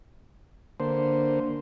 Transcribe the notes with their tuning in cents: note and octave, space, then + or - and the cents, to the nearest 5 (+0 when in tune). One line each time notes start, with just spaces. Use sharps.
D3 +0 A#3 +0 C5 -5